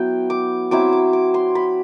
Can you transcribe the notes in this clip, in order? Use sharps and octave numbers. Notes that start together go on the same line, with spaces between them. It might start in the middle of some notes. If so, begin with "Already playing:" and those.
Already playing: F#3 B3 E4 G5
D6
F#3 C4 E4 D6
D6
D6
C6
B5